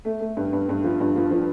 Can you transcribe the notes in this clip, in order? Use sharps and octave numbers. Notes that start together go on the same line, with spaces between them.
A3
A3
G2
G2
G2
F3
G2
F3
F3